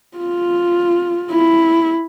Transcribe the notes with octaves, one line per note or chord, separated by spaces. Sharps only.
F4
E4